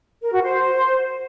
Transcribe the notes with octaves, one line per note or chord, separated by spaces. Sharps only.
A#4
F#4
C5